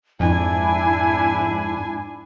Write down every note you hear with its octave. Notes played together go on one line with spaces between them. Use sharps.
F2 G#2 D4 E4 G#5